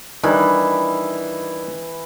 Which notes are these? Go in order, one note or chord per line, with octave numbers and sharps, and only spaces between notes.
D#3 E3 G3 D4